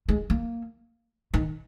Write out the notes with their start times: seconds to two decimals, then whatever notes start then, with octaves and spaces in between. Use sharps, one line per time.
0.09 G#3
0.30 A#3
1.34 D#3